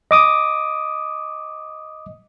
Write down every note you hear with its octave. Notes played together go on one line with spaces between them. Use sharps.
D#5 D6 D#6